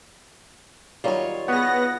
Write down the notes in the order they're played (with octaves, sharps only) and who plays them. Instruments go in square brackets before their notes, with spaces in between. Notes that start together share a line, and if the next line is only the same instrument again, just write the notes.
[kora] D#3 F#3 G3 [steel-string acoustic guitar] F4 C#5
[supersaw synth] B3 A#6 [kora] F#4 G#4 [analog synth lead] F#5